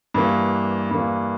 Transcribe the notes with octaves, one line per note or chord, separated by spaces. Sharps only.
G2 E3 A#3
G2 E3 A#3